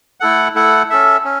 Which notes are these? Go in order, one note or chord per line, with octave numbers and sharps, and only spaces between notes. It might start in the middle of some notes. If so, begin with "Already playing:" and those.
A3 E4 A4 F#5
A3 E4 A4 F#5
C#4 A4 E5
C#4